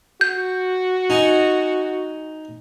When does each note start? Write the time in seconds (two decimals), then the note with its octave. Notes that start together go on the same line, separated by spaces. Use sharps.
0.21 F#4 G6
1.10 D#4 G#5